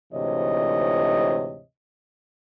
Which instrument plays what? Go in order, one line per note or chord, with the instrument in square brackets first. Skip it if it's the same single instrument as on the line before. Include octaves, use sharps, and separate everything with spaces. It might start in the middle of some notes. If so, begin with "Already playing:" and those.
[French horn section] D2 G#2 C3 E3 C#5 D#5